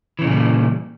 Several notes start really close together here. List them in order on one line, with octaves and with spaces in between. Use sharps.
E3 C#3 A#2 A#3 G3